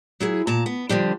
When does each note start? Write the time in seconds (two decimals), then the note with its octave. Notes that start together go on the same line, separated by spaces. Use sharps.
0.20 F#3 E4 G#4
0.47 A#2 A5 A#5
0.66 B3
0.89 D3 F3 G3 D4